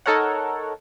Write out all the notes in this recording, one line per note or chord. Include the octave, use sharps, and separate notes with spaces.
D#4 A4 A#4 C#5 F#5